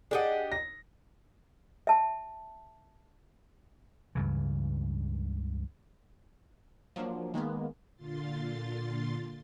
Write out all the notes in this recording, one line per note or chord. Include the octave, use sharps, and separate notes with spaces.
D4 G4 G#4 D#5 F#5
A#6
E5 A5
C#2 G2 C#3 E3
F3 F#3 A#3 D4
D#3 G#3 A#3 B3
A#2 D3 F4 C6 A6